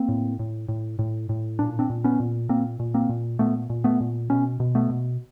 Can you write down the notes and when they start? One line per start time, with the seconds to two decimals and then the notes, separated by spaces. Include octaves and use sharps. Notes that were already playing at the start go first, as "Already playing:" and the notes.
Already playing: A#3 C4
0.09 A2
0.39 A2
0.69 A2
0.99 A2
1.29 A2
1.59 A#2 D4
1.79 C4 D4
1.90 A#2
2.04 B3 C#4
2.20 A#2
2.49 A#2 A#3 C4
2.80 A#2
2.94 A#3 C4
3.09 A#2
3.39 A#2 A3 B3
3.70 A#2
3.84 A3 B3
4.00 A#2
4.30 B2 B3 C#4
4.60 B2
4.75 A3 B3
4.90 B2